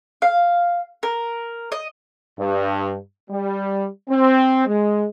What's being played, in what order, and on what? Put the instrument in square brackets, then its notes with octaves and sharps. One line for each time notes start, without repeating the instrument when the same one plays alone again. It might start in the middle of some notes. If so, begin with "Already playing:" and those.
[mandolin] F5
A#4
D#5
[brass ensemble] G2
G3
C4
G#3